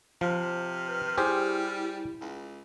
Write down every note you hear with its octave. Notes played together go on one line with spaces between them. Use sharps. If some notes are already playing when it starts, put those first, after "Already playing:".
C3 F3 F6
B4
G3 E4 G4 G#4 C5
C#2